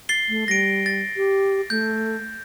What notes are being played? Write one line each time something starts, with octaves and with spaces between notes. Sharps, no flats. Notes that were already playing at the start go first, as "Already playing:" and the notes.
A6 C7 G7
A3
G3 A#6 D7
A6
G4
A3 G6